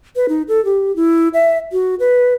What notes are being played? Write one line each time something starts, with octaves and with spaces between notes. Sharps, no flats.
B4
D#4
A4
G4
E4
E5
F#4
B4